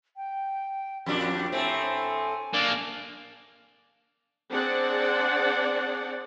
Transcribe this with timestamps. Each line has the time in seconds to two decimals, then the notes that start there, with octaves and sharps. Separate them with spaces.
0.17 G5
1.06 F2 A#2 D4 G4
1.52 A2 A3 C4 G#5
2.53 A#3 D4
4.51 C4 D4 G#4 C5 D5 F#5